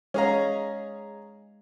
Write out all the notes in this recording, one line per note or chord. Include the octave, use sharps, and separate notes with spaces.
G#3 C#4 G#4 F5 A#5